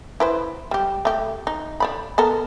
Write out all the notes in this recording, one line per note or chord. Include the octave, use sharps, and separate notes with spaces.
E4 B4 C5
G3 G4
A3 G4
D#4
C5 D5 B5
B3 A4 A#4